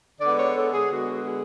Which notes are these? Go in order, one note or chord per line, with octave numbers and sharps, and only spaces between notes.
D3 G#3 B3 D5
C#5
A4
G#4
D3 G#3 B3 F#4
G#4